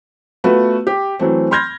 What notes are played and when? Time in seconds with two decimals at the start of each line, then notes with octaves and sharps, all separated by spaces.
0.44 A3 B3 F4 F#4 B4
0.87 G4
1.19 E3 F#3 A3 C4
1.51 B5 C6 F6 G6 G#6 A#6